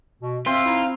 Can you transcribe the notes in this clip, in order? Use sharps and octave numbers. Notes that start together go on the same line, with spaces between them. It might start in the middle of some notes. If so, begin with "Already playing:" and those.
B2
C4 F4 E5
D#4 E4